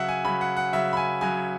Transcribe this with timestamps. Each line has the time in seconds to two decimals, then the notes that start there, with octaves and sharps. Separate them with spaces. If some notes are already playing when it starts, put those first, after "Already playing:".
Already playing: C#3 F#3 E5 F#5
0.08 G#5
0.24 C#3 F#3 B5
0.41 F#5
0.57 F#5
0.73 C#3 F#3 E5
0.93 B5
0.97 G#5
1.21 C#3 F#3 G#5